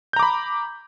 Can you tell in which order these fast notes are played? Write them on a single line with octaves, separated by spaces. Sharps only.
G6 A#5 D6 B5